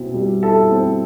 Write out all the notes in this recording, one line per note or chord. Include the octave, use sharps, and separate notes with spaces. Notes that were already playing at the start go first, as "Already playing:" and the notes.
Already playing: B2 C4 E4
G3
E4 A4 A5
C4